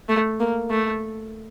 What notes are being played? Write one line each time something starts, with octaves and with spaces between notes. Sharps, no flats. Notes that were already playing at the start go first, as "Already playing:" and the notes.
A3
A#3
A3